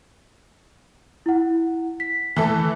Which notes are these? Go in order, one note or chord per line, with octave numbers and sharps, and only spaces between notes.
E4 F#5
B6
E3 A3 A4